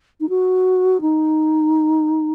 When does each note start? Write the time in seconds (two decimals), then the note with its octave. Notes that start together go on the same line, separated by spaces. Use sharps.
0.20 D#4
0.29 F#4
1.01 D#4